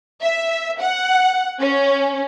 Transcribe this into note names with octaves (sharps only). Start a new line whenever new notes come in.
E5
F#5
C#4